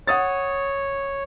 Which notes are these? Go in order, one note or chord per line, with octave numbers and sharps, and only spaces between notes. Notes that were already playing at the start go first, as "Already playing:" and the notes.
C#5 F#5 D#6 A6